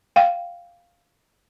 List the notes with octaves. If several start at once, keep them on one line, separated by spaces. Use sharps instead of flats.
F5 G5